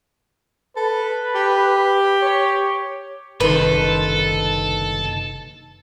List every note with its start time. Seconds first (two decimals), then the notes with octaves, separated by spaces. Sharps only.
0.76 A4 B4
1.35 G4
2.22 C#5
3.40 F#1 C2 D#3 D#4 A4 B4 C6